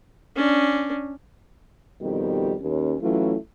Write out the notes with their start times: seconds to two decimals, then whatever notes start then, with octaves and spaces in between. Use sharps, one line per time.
0.36 C#4 D4
2.01 F2 B2 D#3 G3 G4
2.61 D#2 C#4
3.01 E3 F#3 A3 C#4 E4 F4